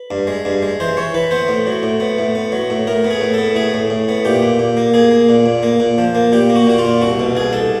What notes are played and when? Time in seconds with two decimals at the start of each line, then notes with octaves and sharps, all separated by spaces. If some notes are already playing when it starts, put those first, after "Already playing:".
Already playing: B4
0.11 G2
0.27 G#3
0.45 G2
0.62 G#3
0.80 E3 C5
0.97 E3 C#5
1.14 E3 B4
1.31 B3 C5
1.48 A2
1.67 F#3
1.83 A2
2.00 B3
2.18 A2
2.35 B3
2.52 F#3
2.70 A2
2.87 A2 A#4
3.04 B3
3.11 G#4
3.21 A2
3.34 B3 A4
3.55 A2 G#4
3.74 A2
3.90 A2
4.08 B3
4.25 A#2 G4
4.42 A#2
4.59 A#2
4.77 A#3
4.94 A#3 G#4
5.11 A#3
5.29 A#2
5.46 A#2
5.63 A#3
5.80 A#2
5.98 F3
6.15 A#3
6.32 A#2 G4
6.50 A#3
6.56 F#4
6.67 A#2 F#4
6.78 F4
6.85 A#2
7.02 C2 F#4
7.19 B2
7.35 C2 G#4
7.53 C2 A4